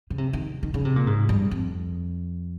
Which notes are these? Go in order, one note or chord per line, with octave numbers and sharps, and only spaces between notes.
C#3
C3
D#3
D#3
C#3
C3
A#2
G#2
G2
F2